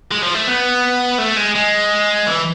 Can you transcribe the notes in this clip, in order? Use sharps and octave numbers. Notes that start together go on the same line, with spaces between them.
G#3
F3
A3
B3
A3
G#3
G#3
E3